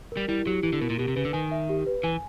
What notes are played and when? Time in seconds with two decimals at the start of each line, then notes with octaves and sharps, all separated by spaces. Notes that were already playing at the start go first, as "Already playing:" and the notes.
0.12 G3 A#4
0.28 G3 E4
0.46 F#3 G4
0.63 E3 E4
0.73 D3
0.81 B2 A#4
0.90 A#2
0.98 B2 G4
1.08 C3
1.16 C#3 B4
1.25 D3
1.33 D#3 G#5
1.51 E5
1.69 G4
1.87 B4
2.03 E3 G#5